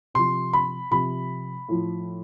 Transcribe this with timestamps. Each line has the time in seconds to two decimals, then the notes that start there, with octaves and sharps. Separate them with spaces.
0.14 C3 F3 C6
0.53 B5
0.91 C3 F3 B5
1.69 A2 F3